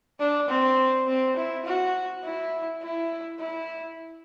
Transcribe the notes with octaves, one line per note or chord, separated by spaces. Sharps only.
D4
C4
C4
E4
F#4
E4
E4
E4